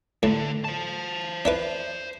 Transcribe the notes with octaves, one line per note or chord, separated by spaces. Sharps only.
A2 D3
C5 A5
D4 E4 B4